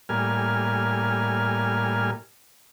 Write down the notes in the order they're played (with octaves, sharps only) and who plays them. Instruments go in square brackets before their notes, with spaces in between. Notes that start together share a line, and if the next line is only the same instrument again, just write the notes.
[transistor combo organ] A2 G3 A#3 G#5 F6